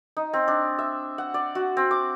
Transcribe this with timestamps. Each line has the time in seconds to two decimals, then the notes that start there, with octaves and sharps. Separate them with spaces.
0.17 D#4
0.33 C4
0.48 D4
0.79 E5
1.18 F#5
1.34 D5
1.55 F#4
1.77 C4
1.91 D6